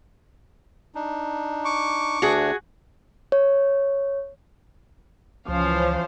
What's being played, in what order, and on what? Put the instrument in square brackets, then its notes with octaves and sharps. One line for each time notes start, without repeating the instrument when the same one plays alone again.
[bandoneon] D4 D#4
[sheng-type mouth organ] C#6 D6
[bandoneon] D2 A3 D4 [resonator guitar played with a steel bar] F#4 G#4
[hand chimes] C#5
[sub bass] C#2 [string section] E3 C#4 F5 [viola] F3 C5